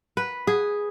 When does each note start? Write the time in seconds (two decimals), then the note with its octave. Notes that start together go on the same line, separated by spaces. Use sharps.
0.17 B4
0.47 G#4